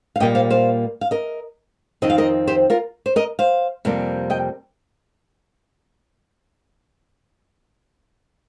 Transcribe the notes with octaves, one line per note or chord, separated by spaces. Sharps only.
F5
A#2 G3 A#3 D#5 G5
C5 F5
C5 F5
F5
A#4 D#5
F2 D#3 C4 D#5
F5
A#4 D#5
G4 C5
F4 A#4
C5
A#4 D#5
C5 F5
F2 C3 G3 A#3
D#5 G5